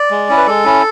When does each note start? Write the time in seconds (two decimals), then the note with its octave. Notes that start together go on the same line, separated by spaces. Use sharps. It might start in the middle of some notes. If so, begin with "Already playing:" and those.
Already playing: D5
0.11 G#3
0.29 C#4 E4
0.37 B4
0.47 G#3 A4
0.65 C#4 E4